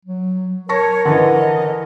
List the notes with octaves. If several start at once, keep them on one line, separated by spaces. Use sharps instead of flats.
F#3
A#4 C#5 A5 C#6 A#6
D3 E3 D#5